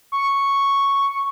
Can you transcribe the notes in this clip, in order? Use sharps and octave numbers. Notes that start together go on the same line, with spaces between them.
C#6